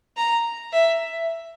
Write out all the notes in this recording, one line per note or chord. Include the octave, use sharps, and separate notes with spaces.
A#5
E5